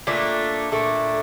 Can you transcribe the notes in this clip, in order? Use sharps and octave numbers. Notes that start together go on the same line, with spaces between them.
A#2 A3 D4
A#2 A3 D4